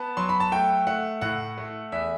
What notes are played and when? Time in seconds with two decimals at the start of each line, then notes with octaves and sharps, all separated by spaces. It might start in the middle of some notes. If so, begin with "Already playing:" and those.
Already playing: B3 A5
0.17 F#3 C6
0.29 B5
0.40 A5
0.52 A3 G5
0.87 A3 F#5
1.21 A2 F#5
1.58 A3
1.92 E2 E5